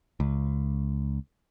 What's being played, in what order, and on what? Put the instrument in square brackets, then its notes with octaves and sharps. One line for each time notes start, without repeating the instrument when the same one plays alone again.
[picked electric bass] C#2